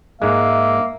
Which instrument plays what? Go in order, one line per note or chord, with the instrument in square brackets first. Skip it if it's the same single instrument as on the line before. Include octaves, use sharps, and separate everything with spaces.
[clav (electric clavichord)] G#2 G#3 [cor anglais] A#3 [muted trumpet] E5